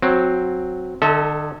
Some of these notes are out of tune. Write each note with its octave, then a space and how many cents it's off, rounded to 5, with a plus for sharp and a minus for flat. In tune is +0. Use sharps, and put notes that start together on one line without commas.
F#3 -10 C4 +0
D3 +40 A4 +0 E5 -35